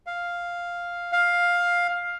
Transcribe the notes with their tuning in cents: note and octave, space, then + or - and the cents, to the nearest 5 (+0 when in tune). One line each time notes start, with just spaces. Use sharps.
F5 +0
F5 +10